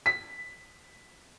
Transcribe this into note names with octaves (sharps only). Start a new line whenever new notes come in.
B6